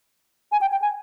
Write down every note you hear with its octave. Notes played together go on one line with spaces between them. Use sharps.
G#5
G5
G5
G#5